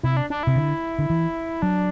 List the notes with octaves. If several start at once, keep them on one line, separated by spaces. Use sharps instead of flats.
C3 E4
D4
D4
C3 E4
D3
D3
E3
F#3 D4